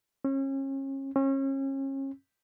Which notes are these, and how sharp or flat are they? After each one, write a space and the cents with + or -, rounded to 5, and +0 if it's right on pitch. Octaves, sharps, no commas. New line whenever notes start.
C#4 -35
C#4 -35